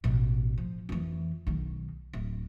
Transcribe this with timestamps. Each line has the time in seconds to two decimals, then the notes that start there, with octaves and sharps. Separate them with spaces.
0.04 A1 B2
0.58 F3
0.89 F2 E3
1.47 B1 D#3
2.13 D1